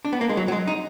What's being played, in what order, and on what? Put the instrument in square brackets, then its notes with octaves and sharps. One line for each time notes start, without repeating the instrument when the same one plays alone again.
[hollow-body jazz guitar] D4
B3
A#3
G#3
F#3
F#3
G#3
D#4